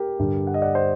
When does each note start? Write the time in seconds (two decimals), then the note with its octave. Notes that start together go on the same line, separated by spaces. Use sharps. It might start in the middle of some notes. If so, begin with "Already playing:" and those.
Already playing: G4 A#4
0.19 G2 D3
0.47 F#5
0.54 D#5
0.62 D5 F#5
0.75 C5 D#5